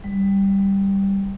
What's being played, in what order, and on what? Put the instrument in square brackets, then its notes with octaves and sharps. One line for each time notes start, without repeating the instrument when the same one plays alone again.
[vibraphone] G3